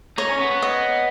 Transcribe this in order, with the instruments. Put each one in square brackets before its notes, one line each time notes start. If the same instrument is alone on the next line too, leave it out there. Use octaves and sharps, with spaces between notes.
[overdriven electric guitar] D#4 [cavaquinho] C#5
[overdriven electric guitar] C#4
B3
B3
[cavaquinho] D#5